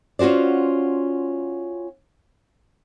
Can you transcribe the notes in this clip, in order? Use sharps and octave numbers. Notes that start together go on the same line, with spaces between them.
C#4 F4 F#4 C5 D5